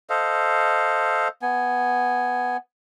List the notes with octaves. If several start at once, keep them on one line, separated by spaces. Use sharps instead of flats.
A4 C5 D#5 F5
B3 G#5